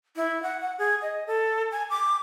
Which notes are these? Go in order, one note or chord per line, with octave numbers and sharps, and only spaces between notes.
E4
F#5
F#5
G#4
D#5
A4
G#5
D6